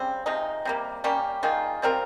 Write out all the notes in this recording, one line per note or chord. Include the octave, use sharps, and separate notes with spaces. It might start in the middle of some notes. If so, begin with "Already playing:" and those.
Already playing: C#3 G3 C4
C3 F3 G#3 D#4
C3 G3 A#3
G3 A#3 C#4 G4
D#3 A#3 F4 G#4
G3 C4 F4 A#4